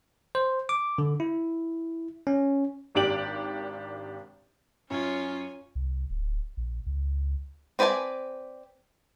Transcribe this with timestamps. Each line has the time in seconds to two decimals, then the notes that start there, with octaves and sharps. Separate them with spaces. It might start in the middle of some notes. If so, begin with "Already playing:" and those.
0.35 C5
0.69 D6
0.98 D3
1.20 E4
2.27 C#4
2.95 G#1 D#3 D4 G4 D7 F#7
4.90 F#2 C#4 F4 C#5 G#5
5.75 C2
6.10 D1
6.57 A#1
6.86 C#2
7.79 C4 B4 D5 G#5 A5